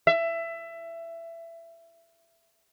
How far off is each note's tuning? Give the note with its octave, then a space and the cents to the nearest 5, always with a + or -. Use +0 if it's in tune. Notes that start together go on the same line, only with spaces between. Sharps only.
E5 +20